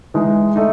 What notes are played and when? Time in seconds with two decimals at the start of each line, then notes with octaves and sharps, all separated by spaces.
0.14 E3 G#3 D#4
0.56 A3 D#4